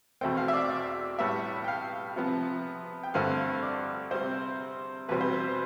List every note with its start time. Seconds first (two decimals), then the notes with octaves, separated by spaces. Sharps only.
0.21 E2 B2 A3 C4 G5
0.37 F5
0.48 E5
0.53 D5
0.70 D5
1.19 A2 G3 B3 E5
1.64 G5
1.68 F5
2.16 C3 F3 B3
3.03 G5
3.14 G2 D3 A3 C4 F5
3.63 D5
4.11 C3 G3 C4 C5
5.08 E2 B2 G3 C4 B4
5.21 C5
5.33 B4